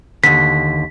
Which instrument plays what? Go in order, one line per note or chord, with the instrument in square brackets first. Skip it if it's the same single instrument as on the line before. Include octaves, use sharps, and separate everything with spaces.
[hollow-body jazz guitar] D#2 D3 [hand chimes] B6